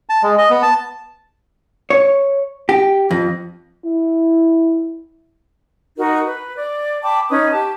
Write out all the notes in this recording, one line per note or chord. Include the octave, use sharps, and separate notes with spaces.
A5
G#3
D#5
B3
A5
C#5
G4
F2
E4
D#4 F#4 A#4
B4
D5
G5 A5 B5 D6
C#4 D#4 B4 D#6
G4 A5